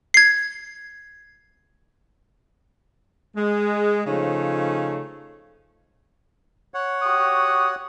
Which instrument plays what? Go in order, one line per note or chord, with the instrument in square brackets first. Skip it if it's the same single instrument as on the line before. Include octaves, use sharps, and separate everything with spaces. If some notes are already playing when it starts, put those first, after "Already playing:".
[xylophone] G#6 C7
[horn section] G#3
C#3 F3 A3 D#4 C#5
[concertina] C#5 F#5
[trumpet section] F#4 G4 D#6